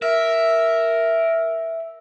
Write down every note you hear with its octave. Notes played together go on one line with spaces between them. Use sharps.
A#4 E5